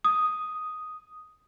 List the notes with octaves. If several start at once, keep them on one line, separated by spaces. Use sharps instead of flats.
D#6